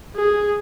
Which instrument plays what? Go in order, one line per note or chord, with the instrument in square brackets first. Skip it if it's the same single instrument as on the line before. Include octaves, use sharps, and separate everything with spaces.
[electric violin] G#4